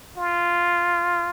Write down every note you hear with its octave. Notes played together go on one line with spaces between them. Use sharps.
F4